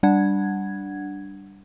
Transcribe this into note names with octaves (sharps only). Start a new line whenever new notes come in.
G3 D4 F#5 G#6